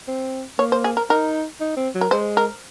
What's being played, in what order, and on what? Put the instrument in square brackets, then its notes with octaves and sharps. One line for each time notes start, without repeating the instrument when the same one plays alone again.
[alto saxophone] C4
[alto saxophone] A#3 [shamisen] C#5
[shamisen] C5
G#4
A#4
[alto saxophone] D#4 [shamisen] A#4
[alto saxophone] D#4
C4
F#3
[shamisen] A#4
[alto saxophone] G#3 [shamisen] C5
[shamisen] A#4